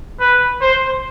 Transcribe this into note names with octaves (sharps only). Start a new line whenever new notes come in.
B4
C5